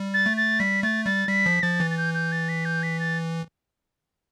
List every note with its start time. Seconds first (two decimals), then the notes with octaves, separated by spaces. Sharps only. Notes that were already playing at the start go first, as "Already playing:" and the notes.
Already playing: G3
0.14 A6
0.26 A3
0.37 A6
0.60 G3 B6
0.83 A3 A6
1.05 G3 A6
1.28 G3 B6
1.46 F3
1.63 F3 A6
1.80 E3
1.91 A6
1.98 G6
2.14 G6
2.32 A6
2.49 B6
2.65 G6
2.83 B6
3.00 A6